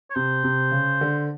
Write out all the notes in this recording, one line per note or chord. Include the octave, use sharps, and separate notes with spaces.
C#5
C3 C5
C3
C#3
D3